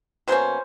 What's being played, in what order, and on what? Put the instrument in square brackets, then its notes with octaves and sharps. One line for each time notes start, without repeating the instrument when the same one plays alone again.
[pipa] B2 F#3 A#3 C#4 C5